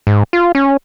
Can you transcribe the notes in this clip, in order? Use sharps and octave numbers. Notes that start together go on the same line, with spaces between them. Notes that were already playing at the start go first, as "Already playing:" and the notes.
G#2
F4
C#4